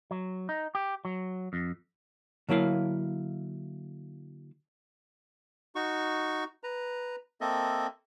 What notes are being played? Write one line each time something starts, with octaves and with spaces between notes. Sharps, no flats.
F#3
D#4
G4
F#3
F2
D3 F#3 A#3 E4 F5
D#4 F#4 C#6
B4 A#5
A#3 C4 A4 D#5 E5